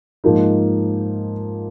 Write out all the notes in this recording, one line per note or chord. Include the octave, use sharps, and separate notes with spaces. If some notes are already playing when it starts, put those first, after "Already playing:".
G#2 F3 A#3 D#4